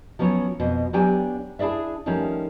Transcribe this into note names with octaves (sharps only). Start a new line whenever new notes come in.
F3 F#3 B3 C#4 C#5
F2 B2
F#3 B3 D4 G4 G5 G#5
D4 E4 G#4 D5 E5
D#3 F3 G3 A3 C#4